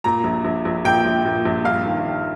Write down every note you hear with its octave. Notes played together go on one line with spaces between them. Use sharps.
A#2 A#5
A#1
A#1
A#1
A#2 G5
A#1
A#2
A#1
G2 F5
D#3
D#3